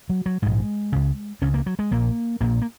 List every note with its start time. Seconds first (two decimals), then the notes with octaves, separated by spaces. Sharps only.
0.09 F#3
0.26 F#3
0.42 A#1 G#2 G#3
0.92 C#2 C#3
1.41 C#2 C#3 C#4
1.54 A#3
1.66 F#3
1.79 G#3
1.91 A#1 A#2 A#3
2.40 A#1 A#2 A#3
2.62 A#3